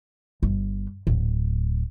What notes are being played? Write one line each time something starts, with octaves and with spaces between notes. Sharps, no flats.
G1
D1